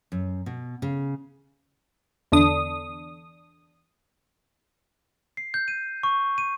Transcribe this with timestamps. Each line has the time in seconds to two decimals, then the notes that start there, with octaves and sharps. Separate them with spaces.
0.12 F#2
0.46 B2
0.82 C#3
2.32 E2 D3 D4 D#6
5.37 C7
5.54 G6
5.68 D#7
6.03 C#6
6.38 D#7